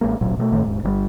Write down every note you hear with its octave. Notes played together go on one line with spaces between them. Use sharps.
A1 G#3 A#3
D1 A1 A#2 F#3
B2 F#3 A3
G1 A2 D#3 A3
D#1 G#2
G1 C#3 G3